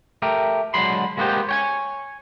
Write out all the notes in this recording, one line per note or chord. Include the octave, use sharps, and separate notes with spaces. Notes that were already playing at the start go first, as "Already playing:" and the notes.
A3 G4 A#4
D3 F#3 G#3 B5 C6
G#3 A#3 B3 F4 G4 C5
C#5 G5 G#5